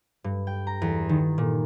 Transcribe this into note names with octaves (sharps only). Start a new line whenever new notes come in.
G2
G5
A#5
E2
D#3
A#2